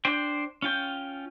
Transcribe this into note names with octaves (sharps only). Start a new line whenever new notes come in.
D4 C5 G5
C#4 F4 G5